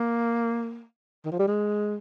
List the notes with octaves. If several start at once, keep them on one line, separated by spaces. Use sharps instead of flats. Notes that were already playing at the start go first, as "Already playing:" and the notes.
Already playing: A#3
D#3
F3
G3
G#3